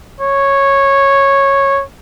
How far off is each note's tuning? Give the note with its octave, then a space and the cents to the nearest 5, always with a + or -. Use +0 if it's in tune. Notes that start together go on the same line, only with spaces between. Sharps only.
C#5 -10